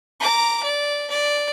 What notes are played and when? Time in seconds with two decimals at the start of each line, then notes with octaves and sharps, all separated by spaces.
0.20 A#5 D6
0.63 D5
1.10 D5